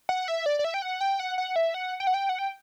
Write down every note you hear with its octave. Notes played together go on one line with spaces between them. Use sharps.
F#5
E5
D5
D5
E5
G5
F#5
G5
F#5
F#5
E5
F#5
G5
F#5
G5
F#5
G5